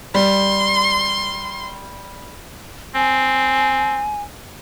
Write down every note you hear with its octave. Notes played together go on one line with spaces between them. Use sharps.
G3 C6
C4 G#5